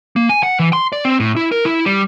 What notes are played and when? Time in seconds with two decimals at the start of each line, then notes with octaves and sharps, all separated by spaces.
0.16 A#3
0.29 G#5
0.43 F#5
0.59 E3
0.73 C6
0.92 D5
1.05 C4
1.20 A2
1.36 E4
1.52 A#4
1.65 E4
1.86 G3